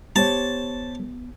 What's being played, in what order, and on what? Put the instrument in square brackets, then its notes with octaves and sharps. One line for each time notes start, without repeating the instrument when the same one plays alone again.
[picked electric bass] B3 [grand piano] G4 C5 C#5 [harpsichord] A5